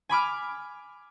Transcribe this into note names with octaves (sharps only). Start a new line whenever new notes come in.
G#5 B5 D6 F6